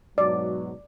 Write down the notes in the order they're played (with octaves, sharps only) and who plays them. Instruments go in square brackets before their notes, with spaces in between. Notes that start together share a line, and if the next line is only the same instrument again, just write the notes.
[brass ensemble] G#2 B2 F#3 [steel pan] D5